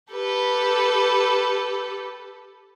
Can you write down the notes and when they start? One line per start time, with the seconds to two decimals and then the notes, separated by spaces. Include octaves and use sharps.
0.12 G4 A4 B4